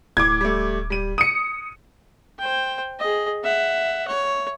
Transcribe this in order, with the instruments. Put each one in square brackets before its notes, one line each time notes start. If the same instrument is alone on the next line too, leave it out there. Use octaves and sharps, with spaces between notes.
[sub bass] D1 [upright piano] A2 [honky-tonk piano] D6 G#6
[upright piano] G3 A3
G3 D#7
[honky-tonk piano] D#6 C#7 [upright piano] D#7
[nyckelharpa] C5 G5
G#4 D#5
E5 F#5
C#5